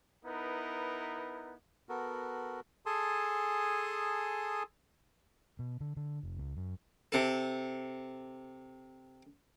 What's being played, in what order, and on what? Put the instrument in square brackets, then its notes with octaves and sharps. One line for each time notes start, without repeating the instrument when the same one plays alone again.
[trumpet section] B3 D#4 E4 A#4 B4
[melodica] B3 F#4 A4 A#4
[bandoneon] G#4 A4 G#5 A5 C6 D#6
[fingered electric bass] B2
D3
D3
F1
C#2
F#2
[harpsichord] C3 A4